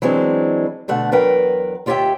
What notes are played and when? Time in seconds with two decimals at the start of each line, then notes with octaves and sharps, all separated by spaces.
0.02 E3 F#3 G#3 C4 D4
0.88 B2 D3 A3 F#5
1.12 E2 F#3 A#4 B4 G5
1.86 D#2 F4 G4 C#5 E5 G5